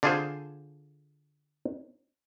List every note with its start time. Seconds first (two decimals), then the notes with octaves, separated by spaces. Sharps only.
0.03 D3 D4 F4 G#4 A4 C5